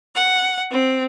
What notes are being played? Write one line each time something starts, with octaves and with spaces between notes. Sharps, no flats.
F#5
C4